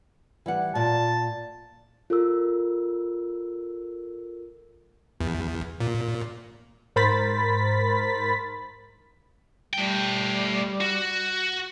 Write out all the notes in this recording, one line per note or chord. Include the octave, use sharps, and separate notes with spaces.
E3 G3 F#5
A#2 A5
F4 A4 A#4 E6
E2
A#2
G#2 A#4 C5 B5 A6 B6
G3 A3 G5
F#4